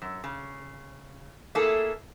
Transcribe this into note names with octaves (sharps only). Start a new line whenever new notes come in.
F#2
C#3
A3 A#3 E4 G#4 A4